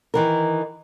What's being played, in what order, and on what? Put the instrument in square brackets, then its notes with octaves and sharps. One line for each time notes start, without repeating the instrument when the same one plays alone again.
[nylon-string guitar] D#3 E3 A#4